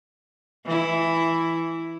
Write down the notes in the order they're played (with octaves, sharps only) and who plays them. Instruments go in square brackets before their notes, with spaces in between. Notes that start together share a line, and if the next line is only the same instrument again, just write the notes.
[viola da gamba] E3 E4